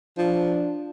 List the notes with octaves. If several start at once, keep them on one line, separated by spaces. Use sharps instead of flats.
F3 D4